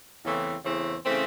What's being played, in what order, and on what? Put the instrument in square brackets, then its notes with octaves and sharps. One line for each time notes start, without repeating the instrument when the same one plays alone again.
[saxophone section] E2 C#3 E3 A3 C4
E2 C#3 E3 A3 C4
C#3 E3 A3 C4